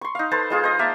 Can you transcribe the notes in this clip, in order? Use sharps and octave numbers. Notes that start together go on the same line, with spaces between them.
C6 C#6
D#4 F5
A4 B4 C5 A5
G#3 F4 G#4
C5 D#5
A#3 E5 F5 A5